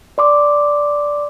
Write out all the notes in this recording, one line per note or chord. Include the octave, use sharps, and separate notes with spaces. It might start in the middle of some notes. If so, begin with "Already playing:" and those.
D5 C6 D6